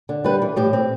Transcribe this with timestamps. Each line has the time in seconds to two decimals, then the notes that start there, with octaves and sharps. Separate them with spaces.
0.09 D3
0.24 G3 B4
0.42 E3
0.56 A2 G4
0.73 C4